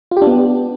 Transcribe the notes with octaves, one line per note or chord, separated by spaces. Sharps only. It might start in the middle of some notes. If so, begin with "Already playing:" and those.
F4
G4
D4
B3